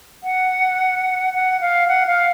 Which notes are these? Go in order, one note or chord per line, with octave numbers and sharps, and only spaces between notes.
F#5
F#5
F5
F#5
F5